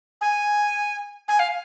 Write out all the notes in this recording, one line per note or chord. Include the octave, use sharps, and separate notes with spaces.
G#5
G#5
F5